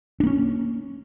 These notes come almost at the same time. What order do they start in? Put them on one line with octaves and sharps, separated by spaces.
D4 A#3 C#4